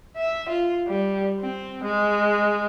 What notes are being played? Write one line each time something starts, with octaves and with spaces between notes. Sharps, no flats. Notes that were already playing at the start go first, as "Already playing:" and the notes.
E5
F4
G3
C4
G#3